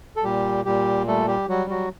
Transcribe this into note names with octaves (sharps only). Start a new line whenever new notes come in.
A4
A#2 G3 G4
A#2 G3 G4
G3 A3 A4
G3 G4
F#3 G3 F#4
F#3 F#4